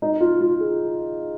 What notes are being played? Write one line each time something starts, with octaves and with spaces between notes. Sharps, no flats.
D#4
F4
F4
G#4